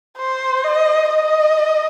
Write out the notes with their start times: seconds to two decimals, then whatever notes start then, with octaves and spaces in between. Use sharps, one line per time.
0.17 C5
0.64 D#5
1.09 D#5